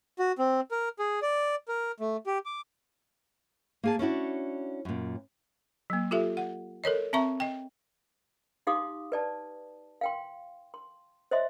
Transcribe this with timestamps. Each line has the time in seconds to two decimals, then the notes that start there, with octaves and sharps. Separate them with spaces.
0.19 F#4
0.39 C4
0.71 A#4
0.99 G#4
1.22 D5
1.68 A#4
2.00 A3
2.27 G4
2.45 D6
3.83 A#3 G#4 A5
3.99 C#4 D4 E4 F#4
4.85 F#2 A#2
5.90 F#3 A#3
6.11 F4 G4 A4 E5
6.37 F#5
6.84 A4 A#4 C#5 D#5
7.13 C4 E5 A#5 C#6
7.40 D#5 G5
8.67 D#4 G4 F5 C6 D6 D#6
9.12 B4 D5 A5
10.01 F5 G5 C6
10.74 C6
11.31 C5 C#5 D#5 E5 C6